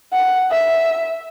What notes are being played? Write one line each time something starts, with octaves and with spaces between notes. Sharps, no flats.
F#5
E5